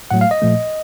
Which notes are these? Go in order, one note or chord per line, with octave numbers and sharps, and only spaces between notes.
A2 F#3 A3 F#5
F5
D#5
A#2 F3 A3